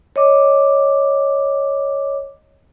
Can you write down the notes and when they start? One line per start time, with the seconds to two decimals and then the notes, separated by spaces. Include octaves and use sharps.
0.16 C#5 D#5 D6